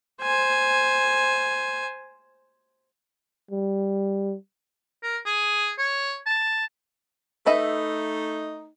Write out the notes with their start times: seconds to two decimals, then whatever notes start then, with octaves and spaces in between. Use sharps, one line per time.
0.21 C5 G#5
3.51 G3
5.03 A#4
5.26 G#4
5.78 C#5
6.26 A5
7.46 A3 D#4 B4 D#5 E5